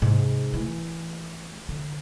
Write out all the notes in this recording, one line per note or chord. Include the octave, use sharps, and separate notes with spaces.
G#2 C3
E3 A3
D3